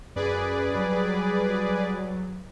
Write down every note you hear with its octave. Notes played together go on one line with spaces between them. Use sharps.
F#2 G#4 B4 D5
F#3 G3